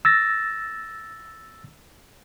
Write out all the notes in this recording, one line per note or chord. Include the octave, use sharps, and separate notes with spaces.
E6 A6 A#6